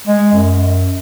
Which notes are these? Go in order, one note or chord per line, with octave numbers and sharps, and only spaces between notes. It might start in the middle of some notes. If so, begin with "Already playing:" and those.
G#3
F#2